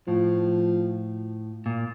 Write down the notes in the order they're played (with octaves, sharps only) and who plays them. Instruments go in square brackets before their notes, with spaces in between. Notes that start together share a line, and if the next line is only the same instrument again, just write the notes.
[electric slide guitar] A2 [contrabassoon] F3
[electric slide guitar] A#2